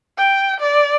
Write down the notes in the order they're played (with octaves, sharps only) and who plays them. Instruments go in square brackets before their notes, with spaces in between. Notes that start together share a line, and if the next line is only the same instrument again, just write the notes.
[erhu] G5
D5